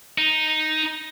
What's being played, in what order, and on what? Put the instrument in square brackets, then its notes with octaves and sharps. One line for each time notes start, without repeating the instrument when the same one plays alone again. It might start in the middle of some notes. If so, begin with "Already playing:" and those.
[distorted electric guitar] D#4